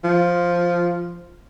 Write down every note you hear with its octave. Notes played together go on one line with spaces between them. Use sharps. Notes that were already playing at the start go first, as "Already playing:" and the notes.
F3